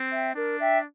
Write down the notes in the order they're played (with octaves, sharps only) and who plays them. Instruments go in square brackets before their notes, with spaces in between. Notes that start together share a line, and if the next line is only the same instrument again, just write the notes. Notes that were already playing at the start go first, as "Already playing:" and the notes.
Already playing: [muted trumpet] C4
[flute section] E5 G5
[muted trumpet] D4 [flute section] A#4
[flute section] E5 G5